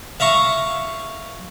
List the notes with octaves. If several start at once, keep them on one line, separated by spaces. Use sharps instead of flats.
E5 F5 A#5 C#6